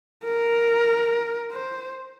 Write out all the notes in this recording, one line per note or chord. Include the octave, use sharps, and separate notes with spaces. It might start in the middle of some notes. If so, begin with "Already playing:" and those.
A#4
C5